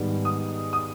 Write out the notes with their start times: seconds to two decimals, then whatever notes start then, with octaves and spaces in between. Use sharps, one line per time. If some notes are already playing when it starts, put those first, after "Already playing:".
Already playing: G#2 D#3 G3 B3
0.25 D#6
0.73 D#6